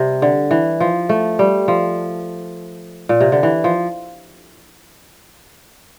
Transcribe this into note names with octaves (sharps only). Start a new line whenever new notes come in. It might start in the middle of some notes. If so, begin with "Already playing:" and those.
Already playing: C3 G3
D3
E3
F3
A3
G3
F3
A#2
C3
D3
E3
F3